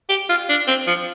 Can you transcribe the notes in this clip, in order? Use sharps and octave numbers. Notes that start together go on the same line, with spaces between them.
G4
F4
D4
C4
F3